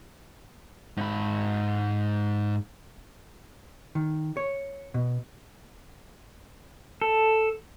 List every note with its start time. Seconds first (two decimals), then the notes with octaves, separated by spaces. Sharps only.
0.97 G#2 B5
3.95 D#3
4.37 C#5
4.94 B2
7.02 A4